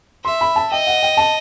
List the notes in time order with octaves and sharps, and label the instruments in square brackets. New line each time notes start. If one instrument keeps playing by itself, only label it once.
[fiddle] E5 [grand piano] C6
[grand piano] B5
A5
[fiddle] D#5 [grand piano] G5
[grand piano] F#5
G5
A5